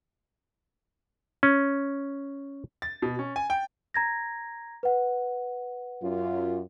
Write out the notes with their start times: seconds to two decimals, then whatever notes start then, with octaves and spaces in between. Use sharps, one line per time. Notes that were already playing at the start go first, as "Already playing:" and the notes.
1.43 C#4
2.82 A6
3.02 B2
3.19 C#4
3.36 G#5
3.50 G5
3.94 A#5 G#6 A#6
4.83 B4 F#5
6.03 F#2 F4